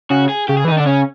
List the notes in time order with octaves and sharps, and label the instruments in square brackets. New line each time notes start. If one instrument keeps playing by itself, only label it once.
[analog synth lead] C#3 [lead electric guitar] F#4
[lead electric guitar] G#4
[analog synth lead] C#3 [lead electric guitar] G4
[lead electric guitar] G#4
[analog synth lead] E3
[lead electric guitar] D#4
[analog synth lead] D#3
[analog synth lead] D3 [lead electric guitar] D4
[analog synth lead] C#3 [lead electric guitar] C#4